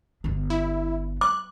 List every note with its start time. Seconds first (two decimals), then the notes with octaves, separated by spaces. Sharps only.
0.24 G1 D4
0.50 E4
1.21 D6 F#6